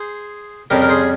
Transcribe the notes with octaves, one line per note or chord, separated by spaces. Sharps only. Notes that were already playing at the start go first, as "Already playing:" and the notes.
Already playing: G#4 C5
F2 C#3 G3 G4 A#4
A#4
G#4 C5